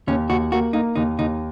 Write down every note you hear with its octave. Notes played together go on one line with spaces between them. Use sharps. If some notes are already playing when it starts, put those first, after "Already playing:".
D#2 C#4
D#2 F#4
A#3 F#4
A#3 D#4
D#2 D#4
D#2 D#4